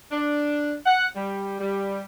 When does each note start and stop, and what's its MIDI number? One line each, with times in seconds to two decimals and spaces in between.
0.11 0.74 62
0.86 1.06 78
1.15 1.57 55
1.60 2.01 55